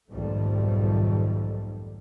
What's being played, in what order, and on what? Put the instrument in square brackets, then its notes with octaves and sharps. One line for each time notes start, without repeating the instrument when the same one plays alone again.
[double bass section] B1 F2 G#2 D#3 G3 A3